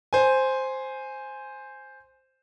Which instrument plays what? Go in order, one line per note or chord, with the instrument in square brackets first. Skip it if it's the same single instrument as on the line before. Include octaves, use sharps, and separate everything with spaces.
[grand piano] C5 G#5